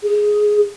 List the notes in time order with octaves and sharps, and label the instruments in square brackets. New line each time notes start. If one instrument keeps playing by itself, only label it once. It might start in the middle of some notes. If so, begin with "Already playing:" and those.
[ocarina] G#4